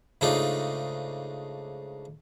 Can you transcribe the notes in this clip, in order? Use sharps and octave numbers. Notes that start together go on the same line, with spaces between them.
G#2 C#3 A3 D4 D#4 F4